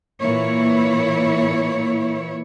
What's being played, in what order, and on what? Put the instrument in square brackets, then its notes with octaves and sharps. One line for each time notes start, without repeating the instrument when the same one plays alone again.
[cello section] A#2 E3 A#3 E4 C#5